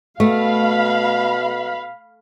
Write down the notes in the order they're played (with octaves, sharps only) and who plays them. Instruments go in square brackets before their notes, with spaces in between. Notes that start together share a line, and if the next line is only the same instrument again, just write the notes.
[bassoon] B2 [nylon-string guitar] A3 [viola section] F5 B5